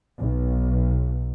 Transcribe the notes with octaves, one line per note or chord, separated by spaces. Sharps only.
B1